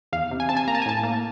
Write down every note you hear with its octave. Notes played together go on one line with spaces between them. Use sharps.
E2 F5
C3
G#5
C3 A5
G#5
A#3 A#5
A5
G#5
A2 A5
A#3